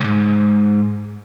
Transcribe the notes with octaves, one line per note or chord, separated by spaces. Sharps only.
C2 G#2